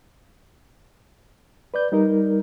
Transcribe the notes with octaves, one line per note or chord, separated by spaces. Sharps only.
B4 D5 G6
G3 D#4 A#4